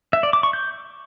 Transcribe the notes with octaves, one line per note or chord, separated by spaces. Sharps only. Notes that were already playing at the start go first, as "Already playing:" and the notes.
E5
D5
D6
C#6
G6